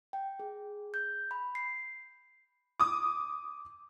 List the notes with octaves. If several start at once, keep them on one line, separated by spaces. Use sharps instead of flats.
G5
G#4
G6
B5
C7
D6 D#6